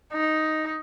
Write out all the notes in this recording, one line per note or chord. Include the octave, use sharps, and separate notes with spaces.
D#4